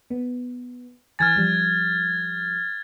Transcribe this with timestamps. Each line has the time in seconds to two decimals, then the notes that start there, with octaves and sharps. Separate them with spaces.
0.10 B3
1.19 E3 G#5 F6 G#6 A6
1.36 F3 G3